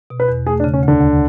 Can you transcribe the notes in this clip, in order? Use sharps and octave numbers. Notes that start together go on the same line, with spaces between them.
B2
B4
E2
A3 G#4
D4
C#3
C#4
D2
D3
D2